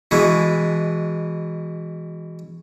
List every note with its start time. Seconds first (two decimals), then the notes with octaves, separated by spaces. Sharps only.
0.11 B2 E3 G#3